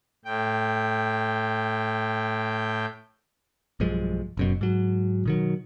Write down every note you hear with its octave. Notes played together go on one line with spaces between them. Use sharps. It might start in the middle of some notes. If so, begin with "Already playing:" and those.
A2 G5
B1 G2 F3 G#3
F#1 F#2 B2
G#2 F#3
B2 D#3 F#3